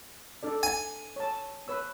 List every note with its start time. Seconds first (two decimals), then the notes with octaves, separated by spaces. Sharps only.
0.43 D4 A4 D5
0.63 G#5
1.16 C#5 A5
1.68 B4 C#5 E6